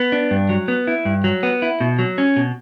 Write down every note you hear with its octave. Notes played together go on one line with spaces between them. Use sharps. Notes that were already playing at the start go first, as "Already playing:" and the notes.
Already playing: B3
D4
G2
F#3
B3
E4
G2
F#3
B3
E4
B2
F#3
C#4
B2